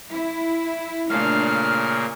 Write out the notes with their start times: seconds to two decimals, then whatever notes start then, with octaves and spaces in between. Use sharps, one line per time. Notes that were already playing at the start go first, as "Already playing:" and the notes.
0.10 E4
1.10 A#2 C#3 A3 A#3 D4 F5 F6